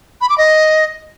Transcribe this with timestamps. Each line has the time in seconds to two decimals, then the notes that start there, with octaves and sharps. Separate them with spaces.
0.21 B5
0.30 D6
0.38 D#5